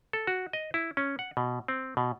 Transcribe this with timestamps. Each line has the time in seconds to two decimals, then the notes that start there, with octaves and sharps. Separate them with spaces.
0.13 A4
0.27 F#4
0.53 D#5
0.74 E4
0.97 C#4
1.19 F#5
1.37 B2
1.68 C4
1.97 B2